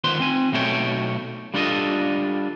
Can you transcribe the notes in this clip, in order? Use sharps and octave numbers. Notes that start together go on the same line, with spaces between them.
D#3 B3 F4 B4 C5 C6
C4 G#5
B1 B2 A3 F#4 C#5 G5
G3 D4 F4 A4 D5 D#5